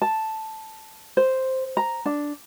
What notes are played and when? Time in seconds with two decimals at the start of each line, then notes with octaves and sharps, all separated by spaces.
0.02 A5
1.17 C5
1.77 A#5
2.06 D4